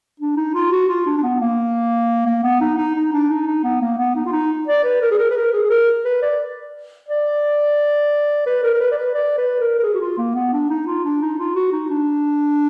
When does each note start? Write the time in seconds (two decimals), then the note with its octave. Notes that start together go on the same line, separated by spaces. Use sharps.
0.20 D4
0.37 D#4
0.54 F4
0.71 F#4
0.89 F4
1.06 D4
1.18 D4
1.23 B3
1.40 A#3
2.26 A#3
2.43 B3
2.61 D#4
2.78 D#4
2.95 D#4
3.13 D4
3.29 D#4
3.47 D#4
3.64 B3
3.81 A#3
3.98 B3
4.16 D#4
4.26 F4
4.32 D#4
4.68 D5
4.84 B4
5.02 A#4
5.11 G#4
5.19 A#4
5.30 B4
5.37 A#4
5.53 G#4
5.63 G#4
5.70 A#4
6.05 B4
6.22 D5
7.08 D5
8.46 B4
8.63 A#4
8.74 A#4
8.81 B4
8.92 D5
8.98 B4
9.15 D5
9.38 B4
9.60 A#4
9.79 A#4
9.83 G#4
9.94 F#4
10.01 F4
10.18 A#3
10.35 B3
10.53 D4
10.70 D#4
10.87 F4
11.04 D4
11.21 D#4
11.39 F4
11.55 F#4
11.73 D#4
11.90 D4